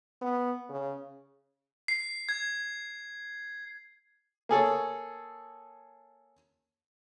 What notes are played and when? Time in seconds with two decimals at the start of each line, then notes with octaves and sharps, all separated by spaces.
0.22 B3
0.69 C#3
1.88 C7
2.29 G#6
4.49 A#3 G#4 A4 C#5